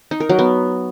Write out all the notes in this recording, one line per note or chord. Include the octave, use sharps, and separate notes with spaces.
D#4
A#4
F#3
B3